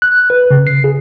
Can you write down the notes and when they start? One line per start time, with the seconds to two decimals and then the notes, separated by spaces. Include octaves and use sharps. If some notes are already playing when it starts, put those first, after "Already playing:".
0.02 F#6
0.30 B4
0.51 C#3
0.67 C7
0.84 G#4